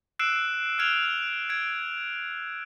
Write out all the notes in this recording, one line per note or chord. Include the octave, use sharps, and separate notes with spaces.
E6 F#6 C7 D7 E7
F6 F#6 G#6 D7 F7
G#6 D7